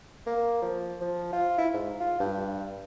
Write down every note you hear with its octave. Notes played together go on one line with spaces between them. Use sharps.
A#3
F3
F3
F4
E4
G#2
F4
G2